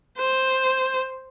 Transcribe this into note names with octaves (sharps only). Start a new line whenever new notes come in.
C5